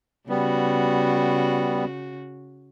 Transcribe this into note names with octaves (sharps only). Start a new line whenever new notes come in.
C#3 G3 B3 F#4